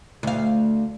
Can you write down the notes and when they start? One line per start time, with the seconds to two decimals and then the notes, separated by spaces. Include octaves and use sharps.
0.23 D2 F5